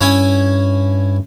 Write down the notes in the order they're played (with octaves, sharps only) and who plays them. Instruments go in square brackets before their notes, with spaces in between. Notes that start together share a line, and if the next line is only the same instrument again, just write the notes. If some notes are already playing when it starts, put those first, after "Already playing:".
[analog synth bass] G2 [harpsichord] C#4 E4 G#5